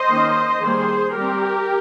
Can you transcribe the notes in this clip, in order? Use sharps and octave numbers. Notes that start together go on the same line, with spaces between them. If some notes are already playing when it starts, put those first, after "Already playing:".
Already playing: C5 D#5
D#3 A#3 C#4
D#3 G3 A#3 G#4 C5
G3 C4 G4 A#4